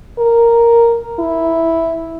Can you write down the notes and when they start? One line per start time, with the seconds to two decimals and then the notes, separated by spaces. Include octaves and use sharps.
0.19 A#4
1.20 E4